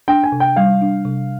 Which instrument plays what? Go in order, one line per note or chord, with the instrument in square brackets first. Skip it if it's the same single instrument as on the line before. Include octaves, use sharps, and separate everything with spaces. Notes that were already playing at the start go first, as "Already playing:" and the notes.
[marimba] D4 [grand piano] G5
[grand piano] G#5
[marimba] C3
[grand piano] G5
[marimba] G3 [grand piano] F5
[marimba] D4
C3